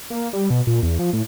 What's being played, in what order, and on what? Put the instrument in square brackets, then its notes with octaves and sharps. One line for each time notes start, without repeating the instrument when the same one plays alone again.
[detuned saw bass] A#3
G3
B2
A#2
E2
F3
A2